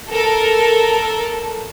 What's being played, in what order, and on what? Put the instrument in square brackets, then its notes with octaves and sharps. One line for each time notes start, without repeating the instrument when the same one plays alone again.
[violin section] A4 A#4